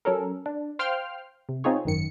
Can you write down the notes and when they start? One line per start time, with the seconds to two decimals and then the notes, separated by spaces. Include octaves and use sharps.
0.05 F#3 C#4 A4 A#4
0.46 D4
0.79 C5 F5 G5 C6 F6
1.49 C3
1.64 C4 D#4 F4 G#4 C#5
1.85 G#1 F#2 D#3 C#7